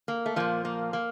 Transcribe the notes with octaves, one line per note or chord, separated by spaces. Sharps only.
A#3
A3
A#2 F3 A#3
A#3
A#3